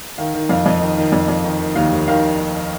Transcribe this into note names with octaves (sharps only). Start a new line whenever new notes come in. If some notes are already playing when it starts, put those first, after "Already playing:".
D#3 F5
D#3
F2 F5
F2 D#5
D#3
D#3
F2
F2
D#3
D#3
D#2 F5
D#2
D#3 F5